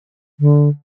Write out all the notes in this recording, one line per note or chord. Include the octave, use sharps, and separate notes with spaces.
D3